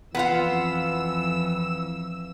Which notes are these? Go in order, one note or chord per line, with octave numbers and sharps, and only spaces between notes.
F2 E3 B3 F4 F#5 E6